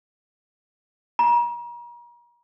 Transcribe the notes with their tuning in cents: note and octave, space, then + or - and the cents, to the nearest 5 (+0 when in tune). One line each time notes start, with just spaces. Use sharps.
A#5 +40